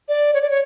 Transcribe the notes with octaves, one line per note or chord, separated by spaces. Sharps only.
D5
C#5
D5
C#5